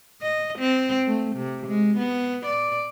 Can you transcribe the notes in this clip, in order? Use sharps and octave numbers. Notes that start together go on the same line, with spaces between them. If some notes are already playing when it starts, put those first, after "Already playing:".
D#5
C4
A3
C3
G#3
B3
D5